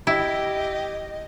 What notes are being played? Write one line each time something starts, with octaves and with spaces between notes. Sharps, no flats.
E4 G4 D#5